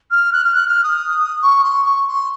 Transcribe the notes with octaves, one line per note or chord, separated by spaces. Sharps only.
F6
F#6
F6
F#6
F6
D#6
C#6
C6
C#6
C6